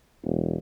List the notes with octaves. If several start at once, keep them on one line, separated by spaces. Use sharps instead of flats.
E1